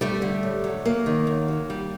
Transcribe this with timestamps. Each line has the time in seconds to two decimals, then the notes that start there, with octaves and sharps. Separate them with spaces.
0.01 G3 A3
0.22 D3
0.43 A2
0.64 F#3
0.85 F#3 A#3
1.06 D#3
1.27 F#2
1.48 F#3
1.70 G3